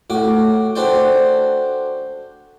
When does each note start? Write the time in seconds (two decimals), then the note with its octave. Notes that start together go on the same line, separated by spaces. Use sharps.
0.10 A2 F#4 D6
0.76 D4 F#4 A4 C5 D5 G5